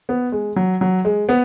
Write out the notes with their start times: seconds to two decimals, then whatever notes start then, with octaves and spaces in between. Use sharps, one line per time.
0.09 B3
0.32 G#3
0.56 F#3
0.81 F#3
1.05 G#3
1.29 B3